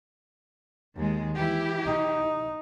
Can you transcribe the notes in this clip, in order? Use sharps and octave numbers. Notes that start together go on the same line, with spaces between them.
D#2 G#3
E3 E4 G4
D#4